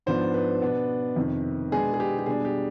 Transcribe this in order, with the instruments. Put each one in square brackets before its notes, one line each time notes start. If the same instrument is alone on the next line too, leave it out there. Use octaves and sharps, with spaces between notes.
[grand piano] G#2 F3 B3 D4 C5
B4
B2 B3 D4
F2 C3 D#3
B2 G#3 B3 D4 G#4
G#4
G4
G4
B2 G3 D4 G#4
G4